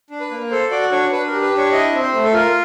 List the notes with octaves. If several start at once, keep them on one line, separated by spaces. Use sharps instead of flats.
D4
B4
A#3
A4 C5
F#4 D5
D4 C#5
D4 B4
A#4
G4
B4
D4 C#5
E4 D#5
C4
C5
A3
A4
F4 A#4